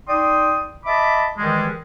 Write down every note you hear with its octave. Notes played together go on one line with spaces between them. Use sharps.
D#4 D5 G5 C6 D#6
D#5 E5 A5 B5 D6
D#3 E3 G3 G#3